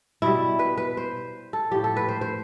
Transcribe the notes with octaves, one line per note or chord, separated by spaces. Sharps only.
B2 G3 E4
B4
B4
C5
A4
A2 F3 G4
A4
B4
C5
C5